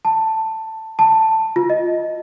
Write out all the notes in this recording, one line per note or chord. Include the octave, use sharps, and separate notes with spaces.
A5
A5
F4
D#5